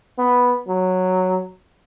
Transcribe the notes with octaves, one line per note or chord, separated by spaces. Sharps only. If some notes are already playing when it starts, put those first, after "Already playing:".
B3
F#3